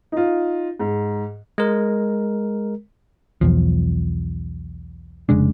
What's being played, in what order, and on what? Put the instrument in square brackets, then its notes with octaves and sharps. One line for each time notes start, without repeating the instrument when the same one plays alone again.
[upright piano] D#4 F4
G#2
[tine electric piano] G#3 A#4
[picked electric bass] B1 E2 F3
F1 C#3 G#3 D4